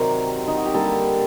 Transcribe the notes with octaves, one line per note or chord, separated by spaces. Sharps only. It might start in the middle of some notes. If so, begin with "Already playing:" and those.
Already playing: C3 D#3 F#3 C4 A#4 C5 D5
D#4
F#4
G4
D3 G3 A#3 A4